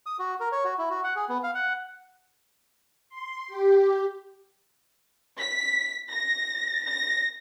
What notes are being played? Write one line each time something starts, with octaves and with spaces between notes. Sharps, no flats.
D#6
F#4
A#4
C#5
F#4
E4
F#4
F#5
G#4
B3
F5
F#5
C6
G4
B6
A#6
A#6